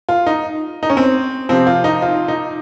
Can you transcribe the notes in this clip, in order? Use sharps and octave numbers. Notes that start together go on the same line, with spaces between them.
F4
D#4
D#4
C#4
C4
C3 F3 C4
F4
D#4
F4
D#4